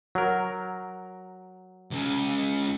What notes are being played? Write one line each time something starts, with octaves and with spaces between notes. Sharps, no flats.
F#3 A#4
C#2 C#3